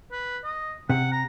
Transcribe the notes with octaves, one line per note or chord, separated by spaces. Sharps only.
B4
D#5
C3 F#5
A#5